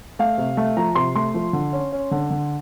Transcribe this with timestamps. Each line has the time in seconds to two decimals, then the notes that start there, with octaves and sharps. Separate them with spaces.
0.19 A3 F5
0.38 C3
0.57 A3
0.77 F3 A#5
0.95 C3 C6
1.15 A3 C6
1.34 F3
1.53 D3
1.73 C#4
1.92 C#4
2.11 D3
2.30 D3